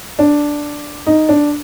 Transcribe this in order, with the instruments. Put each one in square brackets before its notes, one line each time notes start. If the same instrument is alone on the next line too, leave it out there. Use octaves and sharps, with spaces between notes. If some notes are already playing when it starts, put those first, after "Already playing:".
[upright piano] D4
D#4
D4